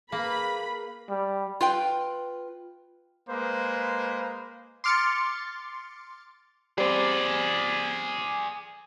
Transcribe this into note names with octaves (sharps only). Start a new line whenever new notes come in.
A#3 G#4 B4 B5
G3
F4 B4 G5
G#3 A#3 B4 C5
C6 D6 F6 A6 C#7
G3 C4 G#4 D5